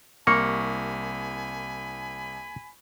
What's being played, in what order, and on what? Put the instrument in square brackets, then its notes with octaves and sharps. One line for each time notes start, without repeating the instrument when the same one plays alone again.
[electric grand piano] C2 [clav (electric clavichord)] A#3 [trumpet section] G#5 B5 [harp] C#6